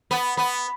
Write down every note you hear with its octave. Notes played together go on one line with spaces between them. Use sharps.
B3
B3